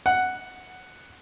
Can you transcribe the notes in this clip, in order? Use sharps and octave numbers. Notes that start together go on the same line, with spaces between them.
F#5